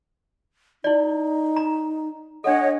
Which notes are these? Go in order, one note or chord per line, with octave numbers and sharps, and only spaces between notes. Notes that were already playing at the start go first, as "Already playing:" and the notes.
D#4 E4 D5
A#5
D4 A4 C#5 D#5 F#5